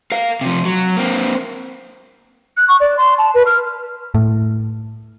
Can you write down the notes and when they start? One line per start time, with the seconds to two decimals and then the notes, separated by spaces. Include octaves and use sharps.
0.12 A#4 F5
0.41 C3 F3
0.65 F#3
0.97 A#3 C4
2.57 F#6
2.68 C#6
2.80 D5
2.97 C6
3.18 A5
3.34 B4
3.46 F6
4.14 A2